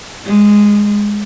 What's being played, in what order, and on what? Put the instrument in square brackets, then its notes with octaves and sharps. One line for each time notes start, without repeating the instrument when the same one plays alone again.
[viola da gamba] G#3